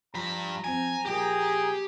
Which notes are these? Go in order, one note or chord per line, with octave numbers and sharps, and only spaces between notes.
G2 F3 A#5 B5
F3 C4 G#5
A#2 F3 A#3 G4 G#4